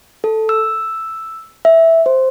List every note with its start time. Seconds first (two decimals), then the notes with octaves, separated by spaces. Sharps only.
0.24 A4
0.49 E6
1.65 E5
2.06 C5